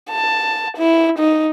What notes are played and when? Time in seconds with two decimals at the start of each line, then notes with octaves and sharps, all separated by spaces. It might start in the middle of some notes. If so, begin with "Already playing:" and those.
0.10 A5
0.78 E4
1.19 D#4